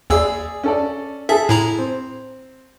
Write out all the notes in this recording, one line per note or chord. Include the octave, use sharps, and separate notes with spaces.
D#2 G#4 D5 E6
C#4 A4 D5
G#4 A4 E5
A2 E4 A#5
C4